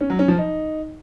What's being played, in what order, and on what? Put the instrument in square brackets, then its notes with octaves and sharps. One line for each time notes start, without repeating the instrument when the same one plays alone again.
[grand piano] C#4
F#3
C#4
F3
D#4